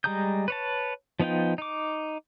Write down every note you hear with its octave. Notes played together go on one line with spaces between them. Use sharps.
G3 G#3 A#5 D#6 G6
B4 C#5 A5
F3 B3 D#4 F4 G5
D#4 D6